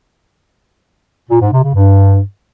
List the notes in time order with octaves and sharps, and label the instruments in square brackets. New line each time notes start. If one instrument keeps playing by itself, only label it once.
[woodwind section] A#2
G#2
C3
C#3
G2